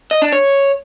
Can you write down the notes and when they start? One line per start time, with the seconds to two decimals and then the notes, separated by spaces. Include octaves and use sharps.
0.11 D#5
0.22 D4
0.32 C#5